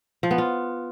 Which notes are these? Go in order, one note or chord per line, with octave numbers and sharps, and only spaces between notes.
F3
B3
F4